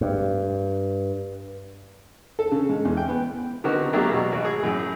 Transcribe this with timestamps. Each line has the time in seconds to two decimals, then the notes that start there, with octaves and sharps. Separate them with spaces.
0.01 G2
2.39 A4
2.51 C#3
2.69 G#2
2.85 E2
2.97 G5
3.09 B3
3.64 D3 D#3 B3 C4 F#4 A#4
3.93 F#3 A3 A#3 D4 G4 G#4
4.11 B2 F#3
4.32 G#1 F#4
4.45 G#4
4.63 F#2 A2